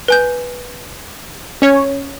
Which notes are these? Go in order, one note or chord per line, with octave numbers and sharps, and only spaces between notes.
B4 G#5 G6
C#4 C#5